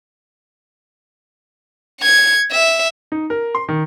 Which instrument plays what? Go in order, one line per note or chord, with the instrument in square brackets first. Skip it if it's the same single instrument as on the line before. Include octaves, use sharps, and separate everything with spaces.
[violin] G#6 C#7
E5
[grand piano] D#4
A#4
C6
D#3